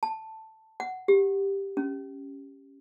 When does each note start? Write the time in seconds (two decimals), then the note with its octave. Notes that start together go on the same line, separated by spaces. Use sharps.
0.03 A5
0.80 F#5
1.08 G4
1.77 C#4